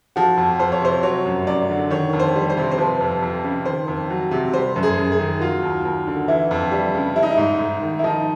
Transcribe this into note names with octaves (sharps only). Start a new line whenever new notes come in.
F3 F#4
F2
F2 C5
C#5
C3 C5
F#3 C#5
F#2
F#2 D5
D3
D#3 C#5
F2
C5
G3
C5
C3
C5
F3 B4
F2
F2
C#3
D#3 C5
F2
F#3
C3
G3 C5
F#2
G#4
F#2
G#4
D#3
F#3 F4
D#2
D#2
D3
E3 E4
F2
G3
C#3
G3 E4
D#4
E4
G#2
G#2
D#3
E4
F3 D#4